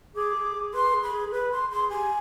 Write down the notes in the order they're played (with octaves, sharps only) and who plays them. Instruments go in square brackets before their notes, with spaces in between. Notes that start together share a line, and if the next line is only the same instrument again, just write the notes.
[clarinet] G#4 [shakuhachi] D6
[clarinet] G#4
G#4
[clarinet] B4 [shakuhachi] C6
[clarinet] G#4
[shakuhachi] B5
[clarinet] G#4
G#4
[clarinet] B4 [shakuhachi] B5
[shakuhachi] C6
[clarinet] G#4 [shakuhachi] C6
[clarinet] G4 [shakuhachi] G#5